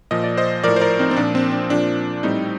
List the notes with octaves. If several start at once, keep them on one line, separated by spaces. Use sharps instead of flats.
A#2 F3 D#5
D5
C5 D#5
A2 F3 A#4 D5
C5
A#4 D5
C4 D#4
C4
A#2 F3 D4
C4
D4
A#2 F3 D4
A2 G3 C4 D#4